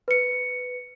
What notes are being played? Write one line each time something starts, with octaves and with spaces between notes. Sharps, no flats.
B4 C#7